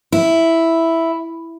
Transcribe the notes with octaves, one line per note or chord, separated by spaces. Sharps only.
E4